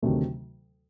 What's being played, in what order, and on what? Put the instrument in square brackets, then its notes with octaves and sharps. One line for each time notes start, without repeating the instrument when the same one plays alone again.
[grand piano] D2 C3 D#3 F#3 A3